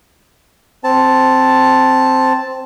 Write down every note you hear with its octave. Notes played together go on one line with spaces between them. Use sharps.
C4 A5